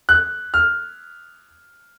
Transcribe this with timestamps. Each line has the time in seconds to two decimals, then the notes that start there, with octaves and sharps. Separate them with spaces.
0.09 F#6
0.54 F6